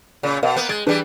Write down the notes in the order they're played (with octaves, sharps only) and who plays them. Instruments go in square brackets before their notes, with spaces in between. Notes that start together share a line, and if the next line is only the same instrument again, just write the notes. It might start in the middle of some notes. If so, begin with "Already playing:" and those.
[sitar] A#2 C#3
[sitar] B2 [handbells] A#4 D#5 F5
[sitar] A#3 B3
[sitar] G#3 [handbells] G#6 A6 D7
[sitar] E3 G3 [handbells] D4 G#4 B4